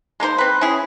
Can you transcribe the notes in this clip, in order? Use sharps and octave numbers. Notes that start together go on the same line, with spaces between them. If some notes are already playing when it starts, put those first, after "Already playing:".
G#3 A#3 D#4 C5
C4 B4
C#4 E4 G#4